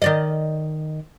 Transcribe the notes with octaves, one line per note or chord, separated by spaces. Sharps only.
D#3 D5 D#5